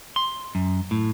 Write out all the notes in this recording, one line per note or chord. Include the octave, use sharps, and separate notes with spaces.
C6
F#2
A2